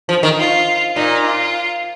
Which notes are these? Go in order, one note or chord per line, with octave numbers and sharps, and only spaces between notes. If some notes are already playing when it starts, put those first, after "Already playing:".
F3
D#3
F4
A#2 D#4
F4